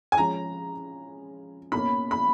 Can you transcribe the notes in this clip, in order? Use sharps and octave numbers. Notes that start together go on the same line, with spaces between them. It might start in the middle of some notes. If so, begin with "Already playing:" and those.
G#5
F3 G#3 C#4 A#5
B2 A#3 C#4 B5
B5